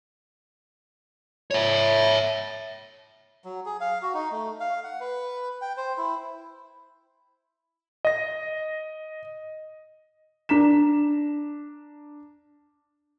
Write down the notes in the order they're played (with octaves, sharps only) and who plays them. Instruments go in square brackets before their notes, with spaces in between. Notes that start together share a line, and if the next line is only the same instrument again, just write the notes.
[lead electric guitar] C#5 E5
[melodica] F#3
G#4
F5
F#4
D#4
A3
F5
F#5
B4
G5
C5
E4
[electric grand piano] D#5 A#6
[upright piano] D4 A#5 B6 E7